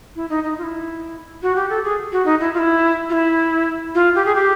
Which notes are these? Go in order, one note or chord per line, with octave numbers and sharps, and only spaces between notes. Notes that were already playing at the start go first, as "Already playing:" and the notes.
E4
D#4
D#4
F4
E4
F#4
G4
A4
G#4
F#4
D#4
E4
F4
E4
F4
E4
F4
G4
G#4
G4